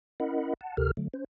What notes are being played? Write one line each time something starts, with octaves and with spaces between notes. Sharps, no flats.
C#4 E4 A#4 D#5 F#5 B5
F#5 A5
D2 C3 G4 A4 A#4 F6
D3 F#3 A3
C#4 C5